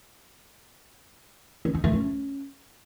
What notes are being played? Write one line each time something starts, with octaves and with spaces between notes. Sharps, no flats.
C#4
D#4
A3
C#4